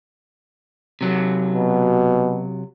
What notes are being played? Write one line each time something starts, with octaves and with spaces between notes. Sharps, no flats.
C3 F#3
B2